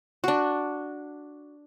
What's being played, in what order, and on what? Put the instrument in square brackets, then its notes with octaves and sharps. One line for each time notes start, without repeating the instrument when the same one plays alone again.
[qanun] D4 F#4